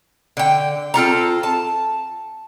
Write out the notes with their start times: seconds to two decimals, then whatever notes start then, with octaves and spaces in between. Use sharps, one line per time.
0.37 D3 G5
0.94 C4 F4 A4 A#5
1.43 A5